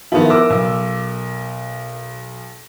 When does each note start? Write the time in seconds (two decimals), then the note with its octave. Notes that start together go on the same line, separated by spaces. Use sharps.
0.12 D#3 F3 B3 E4
0.30 A#4 D6 E6
0.50 B1